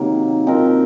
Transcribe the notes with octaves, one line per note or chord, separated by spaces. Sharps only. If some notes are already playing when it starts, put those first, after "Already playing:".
Already playing: C3 D#3 F#3 A#3
F3 C4 D#4 A#4